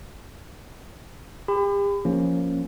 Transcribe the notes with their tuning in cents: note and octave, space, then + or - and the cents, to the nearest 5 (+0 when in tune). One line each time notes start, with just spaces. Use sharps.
G4 +40 B5 +35
F3 +0 A#3 +0 C#4 +0